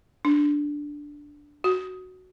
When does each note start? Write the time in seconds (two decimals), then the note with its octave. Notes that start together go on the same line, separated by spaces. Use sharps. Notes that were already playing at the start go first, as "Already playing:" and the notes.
0.25 D4
1.64 F#4